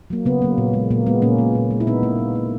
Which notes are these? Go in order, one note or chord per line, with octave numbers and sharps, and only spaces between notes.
F#3 A#3
C#3 B3
F#3 A#3
A#2
G#3
A#2 A#3
G#3 B3
A#2 A#3 C#4
G#3
A#2
G#3
E4
A#2 B3 D#4
A#3
A#2
A#3